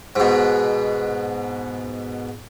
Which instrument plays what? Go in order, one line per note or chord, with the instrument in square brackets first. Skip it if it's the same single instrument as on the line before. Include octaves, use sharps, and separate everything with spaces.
[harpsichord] G#2 B2